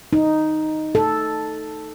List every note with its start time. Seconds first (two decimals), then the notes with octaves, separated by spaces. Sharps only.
0.13 D#4
0.95 A4